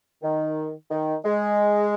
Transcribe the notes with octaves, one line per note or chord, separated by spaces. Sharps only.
D#3
D#3
G#3